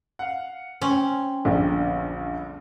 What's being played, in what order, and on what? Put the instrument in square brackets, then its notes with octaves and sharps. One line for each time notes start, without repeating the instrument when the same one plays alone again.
[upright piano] F5 F#5
[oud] C4 [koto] C#4 [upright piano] G#5
[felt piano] A#1 [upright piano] E2 G2 D3